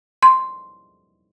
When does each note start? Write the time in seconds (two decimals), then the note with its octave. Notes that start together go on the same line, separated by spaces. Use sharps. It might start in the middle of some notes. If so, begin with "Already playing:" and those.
0.23 C6